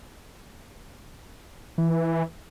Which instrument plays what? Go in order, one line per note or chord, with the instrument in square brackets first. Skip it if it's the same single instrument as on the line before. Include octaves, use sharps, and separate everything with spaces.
[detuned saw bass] E3